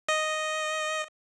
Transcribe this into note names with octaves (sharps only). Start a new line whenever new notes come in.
D#5